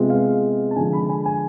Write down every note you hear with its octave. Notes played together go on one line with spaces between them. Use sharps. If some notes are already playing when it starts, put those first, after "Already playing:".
Already playing: C3 G#3 B3 F4
F5
A5
D3 F3 G#3 G#5
B5
G#5
G#5